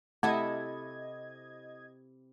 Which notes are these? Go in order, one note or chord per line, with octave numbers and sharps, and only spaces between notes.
C3 A3 E4 A4 D#5 F#5 A5 G#6